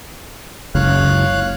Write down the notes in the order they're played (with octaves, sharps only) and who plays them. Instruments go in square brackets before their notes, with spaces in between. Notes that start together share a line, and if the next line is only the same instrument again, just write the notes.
[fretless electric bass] F#1 C#2 [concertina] C#5 F5 F#6